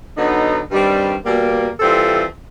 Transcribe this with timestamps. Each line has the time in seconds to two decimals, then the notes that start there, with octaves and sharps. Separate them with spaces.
0.16 D3 F#3 B3 D#4
0.70 G2 D#3 G3 C4
1.25 B2 G3 A#3
1.80 E3 G3 C4 F4 A4